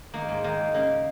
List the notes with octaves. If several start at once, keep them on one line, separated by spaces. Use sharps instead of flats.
D#3 A#3
G#2
D#3 A#3
G#2
C#3 A#3